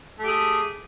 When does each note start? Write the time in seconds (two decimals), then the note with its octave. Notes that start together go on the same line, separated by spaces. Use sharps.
0.19 A3
0.23 G4
0.28 G#4